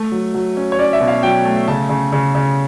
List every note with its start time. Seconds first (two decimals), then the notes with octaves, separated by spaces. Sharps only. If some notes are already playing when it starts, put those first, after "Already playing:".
Already playing: A3
0.12 F#3
0.34 F#3
0.57 C#4
0.72 C#5
0.79 C#4 D5
0.93 E5
1.01 B2
1.08 F5
1.23 F#3 G5
1.45 A3
1.68 C#3 A5
1.89 C#3
2.12 C#3
2.35 C#3